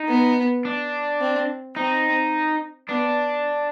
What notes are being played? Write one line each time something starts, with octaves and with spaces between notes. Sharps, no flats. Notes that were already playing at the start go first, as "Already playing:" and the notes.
Already playing: D#4
B3
D4
C4
C4 D#4
B3 D4